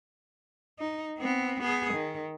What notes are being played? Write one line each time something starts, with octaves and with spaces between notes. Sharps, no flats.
D#4
B3 C4
B3 G#4
D#3